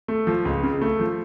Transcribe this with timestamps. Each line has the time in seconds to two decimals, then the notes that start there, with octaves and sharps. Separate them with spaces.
0.08 A3
0.27 F3
0.45 C#2
0.63 C#3
0.82 A3
1.00 F3